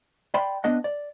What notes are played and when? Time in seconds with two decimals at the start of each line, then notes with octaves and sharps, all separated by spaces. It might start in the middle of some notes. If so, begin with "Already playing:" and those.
0.34 D5 G5 B5 C6
0.64 B3 D4 D#5 F#5
0.84 D5